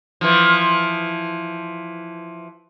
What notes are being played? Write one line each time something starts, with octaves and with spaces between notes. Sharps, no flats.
E3 F3